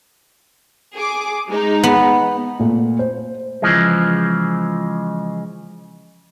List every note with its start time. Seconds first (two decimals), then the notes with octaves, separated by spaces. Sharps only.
0.95 G#4 D6
1.49 G#3 D#4
1.84 B3
2.60 A#2 A3
2.99 C5
3.62 C#3 E3 F3 G#3